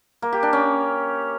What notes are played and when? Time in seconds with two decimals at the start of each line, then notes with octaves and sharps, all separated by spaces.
0.22 A#3
0.33 G4
0.43 D4
0.53 C#4